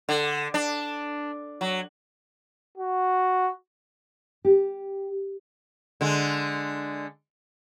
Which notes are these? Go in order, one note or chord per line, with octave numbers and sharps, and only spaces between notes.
D3
D4
F#3
F#4
G4
D3 G#3